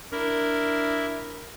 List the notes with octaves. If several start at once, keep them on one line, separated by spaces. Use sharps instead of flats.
D4 E4 A#4